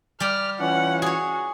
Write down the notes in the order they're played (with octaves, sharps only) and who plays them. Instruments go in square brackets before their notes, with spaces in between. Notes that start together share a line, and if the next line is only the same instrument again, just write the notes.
[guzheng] G3 G4 D5 [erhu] F6
[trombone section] E3 C#4 F4 [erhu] F#5
[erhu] F#4 [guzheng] G#4 C#5